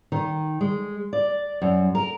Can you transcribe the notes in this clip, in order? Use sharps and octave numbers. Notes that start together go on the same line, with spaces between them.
D#3
G#3
D5
F#2
A#4